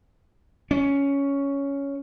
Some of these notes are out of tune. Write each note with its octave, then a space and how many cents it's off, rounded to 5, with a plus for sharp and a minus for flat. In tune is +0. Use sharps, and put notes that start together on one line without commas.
C#4 +10